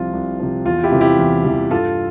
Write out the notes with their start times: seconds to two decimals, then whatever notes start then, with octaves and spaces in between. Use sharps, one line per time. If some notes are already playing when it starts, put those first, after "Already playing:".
Already playing: C2 C3 F3 F4
0.13 C2
0.40 C3 F3
0.65 E2 F4
0.83 E4 G4
0.92 C3 E3 G3
1.01 E4 G4
1.18 E2
1.45 C3 E3 G3
1.71 G2 F4 A4